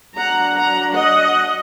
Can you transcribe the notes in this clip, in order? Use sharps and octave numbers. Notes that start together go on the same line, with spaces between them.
F#3 D4 F#5 A#5
F#5 A#5
D#5 F#5